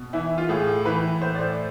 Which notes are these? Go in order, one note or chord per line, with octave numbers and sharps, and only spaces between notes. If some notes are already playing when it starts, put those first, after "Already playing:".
Already playing: B2
E3 E4
F4
A2 G#4
E3 B4
A2 C5
D5
C5